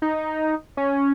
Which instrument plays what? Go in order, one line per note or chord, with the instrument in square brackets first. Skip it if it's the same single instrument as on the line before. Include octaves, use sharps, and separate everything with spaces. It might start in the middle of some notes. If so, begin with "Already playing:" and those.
[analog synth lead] D#4
C#4